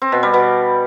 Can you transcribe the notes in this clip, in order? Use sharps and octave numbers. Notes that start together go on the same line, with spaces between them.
C4
B2
G3
B2